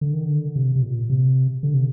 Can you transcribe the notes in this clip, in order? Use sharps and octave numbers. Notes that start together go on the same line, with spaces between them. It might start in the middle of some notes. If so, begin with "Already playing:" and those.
D3
D#3
D3
C3
C3
A#2
C3
D3
C3